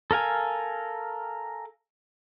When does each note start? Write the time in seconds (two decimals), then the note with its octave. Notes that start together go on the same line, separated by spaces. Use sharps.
0.11 A4 A#4 F5 G#5